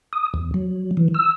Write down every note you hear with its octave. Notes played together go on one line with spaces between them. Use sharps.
D#6
E2
F#3
E3
E6